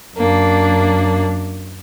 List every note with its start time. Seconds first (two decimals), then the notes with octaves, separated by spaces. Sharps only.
0.17 F#2 A#3 D4